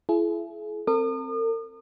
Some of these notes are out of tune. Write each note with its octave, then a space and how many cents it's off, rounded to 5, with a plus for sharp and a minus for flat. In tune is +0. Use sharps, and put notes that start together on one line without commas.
E4 +35 G#4 +40
C4 +5 A#4 -45 D#6 -40